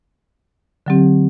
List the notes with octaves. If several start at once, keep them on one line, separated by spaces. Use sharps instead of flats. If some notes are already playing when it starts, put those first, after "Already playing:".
D3 F#3 C4 G4